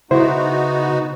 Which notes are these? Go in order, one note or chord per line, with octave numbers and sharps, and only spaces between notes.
C#3 B3 D#4 E4 F#4 C5